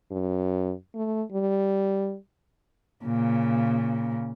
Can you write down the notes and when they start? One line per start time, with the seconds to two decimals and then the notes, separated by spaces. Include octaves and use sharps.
0.11 F#2
0.95 A3
1.32 G3
3.04 A#2 C#3